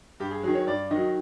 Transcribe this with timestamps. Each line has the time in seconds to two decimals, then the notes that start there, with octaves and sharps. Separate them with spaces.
0.20 G2 G4
0.31 G#4
0.43 D#3 F#3 G#4
0.55 C#5
0.67 G2 D5
0.91 D#3 D#5
0.96 F#3